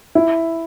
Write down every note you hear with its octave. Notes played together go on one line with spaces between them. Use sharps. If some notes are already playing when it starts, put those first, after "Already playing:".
E4